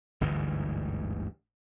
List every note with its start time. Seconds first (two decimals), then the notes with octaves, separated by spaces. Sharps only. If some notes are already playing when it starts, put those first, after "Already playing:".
0.21 G1 D2 G#2 E3